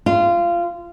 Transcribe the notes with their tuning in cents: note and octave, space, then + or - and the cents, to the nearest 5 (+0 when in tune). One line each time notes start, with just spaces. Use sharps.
F4 -20